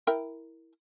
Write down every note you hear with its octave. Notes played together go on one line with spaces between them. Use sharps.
E4 A#4 G5